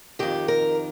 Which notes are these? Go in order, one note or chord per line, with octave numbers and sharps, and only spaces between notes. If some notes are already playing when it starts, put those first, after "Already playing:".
F2 D#3 G4
A#4